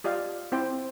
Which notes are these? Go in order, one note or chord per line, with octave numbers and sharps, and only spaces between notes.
F4 G4 D5 D#5 F5
C4 E4 C5 G5